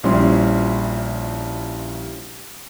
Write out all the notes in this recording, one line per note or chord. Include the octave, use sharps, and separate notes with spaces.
A#1 F3 G3 C#4 E4 C6